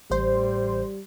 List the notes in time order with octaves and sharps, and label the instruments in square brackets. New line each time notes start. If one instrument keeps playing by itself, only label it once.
[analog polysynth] A1 C5 [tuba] G3